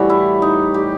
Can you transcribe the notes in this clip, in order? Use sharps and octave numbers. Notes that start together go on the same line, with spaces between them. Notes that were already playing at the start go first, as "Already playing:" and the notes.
Already playing: A2 E3 G3 F#4
E4
D#4
G4